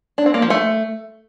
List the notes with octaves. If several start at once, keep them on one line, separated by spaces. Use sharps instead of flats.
D4
C4
A#3
F3
A3